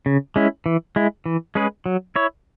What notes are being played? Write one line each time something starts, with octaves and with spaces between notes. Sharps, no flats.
C#3
G#3 C#4 E4
E3
G#3 E4
E3
G#3 C#4 G#4 B4
F#3
E4 C#5